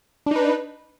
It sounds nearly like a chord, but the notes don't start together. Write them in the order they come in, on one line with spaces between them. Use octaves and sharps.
D4 D#4 B4